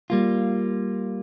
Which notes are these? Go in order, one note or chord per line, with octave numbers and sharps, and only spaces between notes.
G3 A#3 F4